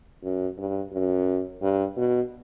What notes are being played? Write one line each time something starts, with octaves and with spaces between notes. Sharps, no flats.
F#2
G2
F#2
G2
B2